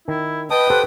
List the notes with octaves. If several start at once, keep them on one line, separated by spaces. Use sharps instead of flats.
D#3 E4
B4 D#5 G5 A5 D#6
G4 A4 C5 F#5